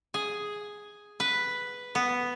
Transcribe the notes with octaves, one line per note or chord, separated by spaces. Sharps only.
G#4
B4
B3